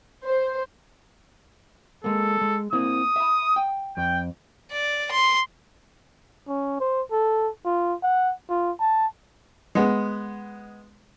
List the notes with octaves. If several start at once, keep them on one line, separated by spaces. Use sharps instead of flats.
C5
G#3 A#3 A4
G#3
A#3 C4 E4 D#6
E5 B5
G5
F2 G5
D5
C6
C#4
C5
A4
F4
F#5
F4
A5
G#3 B3